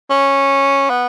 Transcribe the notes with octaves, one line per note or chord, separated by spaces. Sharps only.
C#4
B3